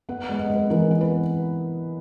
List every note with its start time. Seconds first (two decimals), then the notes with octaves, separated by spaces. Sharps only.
0.09 B3 F#5
0.24 F#5
0.29 G#3
0.40 D#5
0.50 G#3 B4
0.70 E3 A#4
0.91 B3
1.01 B4